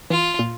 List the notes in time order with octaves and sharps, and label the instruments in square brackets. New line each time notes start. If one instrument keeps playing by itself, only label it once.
[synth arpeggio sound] E3 [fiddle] F4
[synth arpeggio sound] A#2